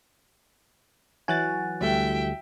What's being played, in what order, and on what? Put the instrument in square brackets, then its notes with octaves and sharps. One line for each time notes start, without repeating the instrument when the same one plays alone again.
[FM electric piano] E3 F#3 F#4 [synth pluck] G#5 F#6 A6
[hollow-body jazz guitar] D2 G3 A3 [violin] E5 G5